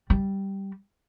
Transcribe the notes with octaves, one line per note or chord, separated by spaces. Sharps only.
G3